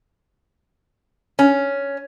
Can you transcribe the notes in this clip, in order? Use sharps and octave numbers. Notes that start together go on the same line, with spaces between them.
C#4